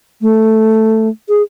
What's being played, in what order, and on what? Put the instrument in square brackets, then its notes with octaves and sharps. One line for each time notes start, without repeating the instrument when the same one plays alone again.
[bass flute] A3
G#4